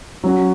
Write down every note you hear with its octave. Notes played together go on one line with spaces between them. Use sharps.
F#3 C#4 F#4